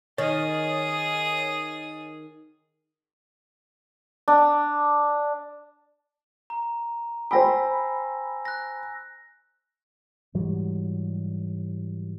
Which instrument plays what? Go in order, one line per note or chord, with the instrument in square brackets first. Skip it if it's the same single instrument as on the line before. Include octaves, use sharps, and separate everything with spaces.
[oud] D#3 [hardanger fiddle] G#4 D#6 [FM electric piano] C#5 A6
[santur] D4
[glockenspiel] A#5
[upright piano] C5 G5 B5 [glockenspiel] G#5 E6 A#6
[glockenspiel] F#6 A#6
[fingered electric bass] G#2 E3 F#3 G3